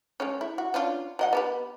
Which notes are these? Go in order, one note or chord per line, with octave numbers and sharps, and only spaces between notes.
G#3 A3 C#4
E4
F#4
C#4 D4 F4
F#3 D#5 F#5
B3 G4 B4